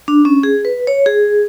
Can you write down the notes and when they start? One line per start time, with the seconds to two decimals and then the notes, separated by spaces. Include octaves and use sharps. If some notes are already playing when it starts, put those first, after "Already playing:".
0.08 D4
0.25 C#4
0.43 G#4
0.65 B4
0.87 C#5
1.06 G#4